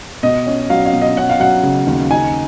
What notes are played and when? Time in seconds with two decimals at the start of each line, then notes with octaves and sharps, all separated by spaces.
0.23 B2 D#5
0.47 C#4
0.70 F#3 F5
0.86 F5
0.93 B2
1.02 D#5
1.17 C#4 F#5
1.29 F5
1.40 F#3 F#5
1.63 C#3
1.87 D#2
2.10 D#4 G#5